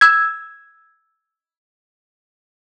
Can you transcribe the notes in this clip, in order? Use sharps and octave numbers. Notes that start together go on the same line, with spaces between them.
E6 G#6